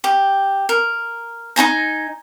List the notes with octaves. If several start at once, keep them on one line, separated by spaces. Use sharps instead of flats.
G4
A#4
D#4 E4 G#5 A#5